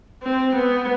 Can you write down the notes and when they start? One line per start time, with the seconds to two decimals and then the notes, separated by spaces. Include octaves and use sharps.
0.23 C4
0.56 B3